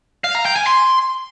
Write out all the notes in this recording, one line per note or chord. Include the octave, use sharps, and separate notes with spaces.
F5
A#5
G5
G#5
C6